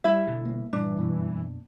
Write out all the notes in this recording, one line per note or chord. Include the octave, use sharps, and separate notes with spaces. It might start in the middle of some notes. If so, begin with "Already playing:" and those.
G3 E4 E5
G1 B2 D3
A#3
G2 A#2 E3 G3 D4
F#2 B2 A#3